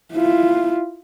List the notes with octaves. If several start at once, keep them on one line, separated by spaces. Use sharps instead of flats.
E4 F4